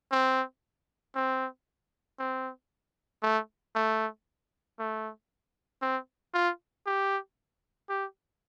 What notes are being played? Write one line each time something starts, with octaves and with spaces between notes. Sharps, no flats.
C4
C4
C4
A3
A3
A3
C4
F4
G4
G4